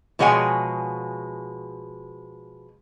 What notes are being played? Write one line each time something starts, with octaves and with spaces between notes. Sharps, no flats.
B2 F3 G#3 C#5 F#5 G#5